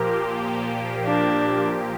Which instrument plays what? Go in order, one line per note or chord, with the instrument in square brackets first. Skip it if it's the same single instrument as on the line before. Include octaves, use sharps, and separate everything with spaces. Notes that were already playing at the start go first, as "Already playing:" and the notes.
Already playing: [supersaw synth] A#2 F3 A#3 G4 [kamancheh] A#4
[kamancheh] D4